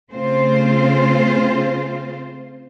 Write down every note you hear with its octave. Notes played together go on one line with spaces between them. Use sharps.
C#3 A3 C4 F4 C5